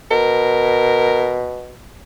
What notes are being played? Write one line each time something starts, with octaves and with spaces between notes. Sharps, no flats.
B2 A#4